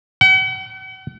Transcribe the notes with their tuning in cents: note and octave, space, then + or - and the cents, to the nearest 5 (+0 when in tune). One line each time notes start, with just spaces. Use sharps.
F#5 +45